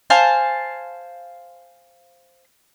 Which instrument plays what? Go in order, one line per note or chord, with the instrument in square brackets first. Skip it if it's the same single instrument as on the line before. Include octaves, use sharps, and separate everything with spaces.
[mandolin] C5 F5 G#5 A5